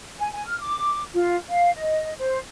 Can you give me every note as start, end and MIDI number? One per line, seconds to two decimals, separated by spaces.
0.20 0.28 80
0.32 0.44 80
0.47 0.60 89
0.61 1.04 86
1.14 1.37 65
1.49 1.70 77
1.75 2.14 75
2.20 2.39 72